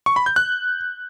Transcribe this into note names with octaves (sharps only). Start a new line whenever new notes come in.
C#6
B5
G6
F#6